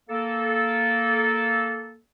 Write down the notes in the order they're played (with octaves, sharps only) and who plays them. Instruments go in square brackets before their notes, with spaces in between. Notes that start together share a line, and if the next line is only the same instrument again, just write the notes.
[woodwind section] A#3 A4